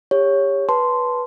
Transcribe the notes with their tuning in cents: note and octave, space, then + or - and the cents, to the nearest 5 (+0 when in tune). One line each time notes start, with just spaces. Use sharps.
G4 +30 C#5 +0
B4 -10 A5 +0 C6 -10